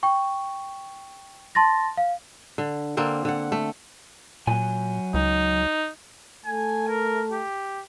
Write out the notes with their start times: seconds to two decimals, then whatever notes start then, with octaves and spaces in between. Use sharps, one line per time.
0.03 G5 C#6
1.55 A5 C6 A6 A#6
1.97 F5
2.58 D3
2.97 D3 A#3 C4
3.25 D3 F#5
3.52 A3
4.47 A#2 F#3 G#5
5.14 C#2 D#4
6.45 A3 G#5
6.88 A#4
7.31 G4